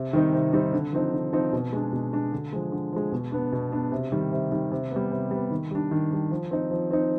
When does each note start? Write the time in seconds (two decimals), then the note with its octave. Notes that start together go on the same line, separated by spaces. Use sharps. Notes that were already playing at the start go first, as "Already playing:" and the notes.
Already playing: C3
0.13 D#3 G3 C4 D#4
0.33 C3
0.53 D#3 G3 C4 D#4
0.73 D3
0.93 F3 C4 D#4
1.13 D3
1.33 F3 C4 D#4
1.53 B2
1.73 G#3 D4
1.92 B2
2.13 G#3 D4
2.32 D3
2.53 F3 G#3
2.72 D3
2.93 F3 G#3
3.12 B2
3.32 B3 D4
3.52 B2
3.72 B3 D4
3.92 C3
4.12 D#3 G3
4.32 C3
4.52 D#3 G3
4.72 C3
4.91 G3 B3
5.12 C3
5.31 G3 B3
5.51 D#3
5.71 G3 D4
5.91 D#3
6.11 G3 D4
6.31 F3
6.51 C4 D#4
6.71 F3
6.91 C4 D#4